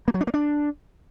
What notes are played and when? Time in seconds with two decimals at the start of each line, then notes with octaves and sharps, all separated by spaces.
0.08 A#3
0.14 F#3
0.21 D4
0.27 A#3
0.34 D4